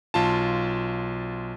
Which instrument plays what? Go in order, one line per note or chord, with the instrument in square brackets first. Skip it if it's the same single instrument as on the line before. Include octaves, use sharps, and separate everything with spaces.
[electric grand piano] B1 F4 A5